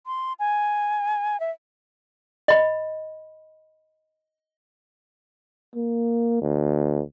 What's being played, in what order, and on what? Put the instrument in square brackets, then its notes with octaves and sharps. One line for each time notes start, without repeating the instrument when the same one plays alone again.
[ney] C6
G#5
E5
[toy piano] D#5 B5
[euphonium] A#3
D2